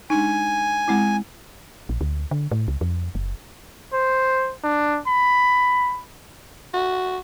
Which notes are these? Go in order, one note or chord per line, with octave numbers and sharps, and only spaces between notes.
G#3 D4 D#4 G#5
G#3 C4 E4
A#1
D2
D3
A2
C#2
F2
F#1
C5
D4
B5
F#4